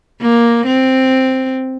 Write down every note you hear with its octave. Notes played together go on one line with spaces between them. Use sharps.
A#3
C4